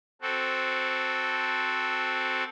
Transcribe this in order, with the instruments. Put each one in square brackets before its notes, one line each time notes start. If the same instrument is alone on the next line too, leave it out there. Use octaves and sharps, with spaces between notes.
[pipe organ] C4 F#4 A4